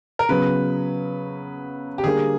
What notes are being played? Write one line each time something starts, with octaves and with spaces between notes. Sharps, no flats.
A#4
C#3 F#3 B3 B4
G4
D3 G3 A#3 G#4